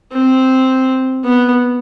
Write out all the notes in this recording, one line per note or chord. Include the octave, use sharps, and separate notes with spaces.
C4
B3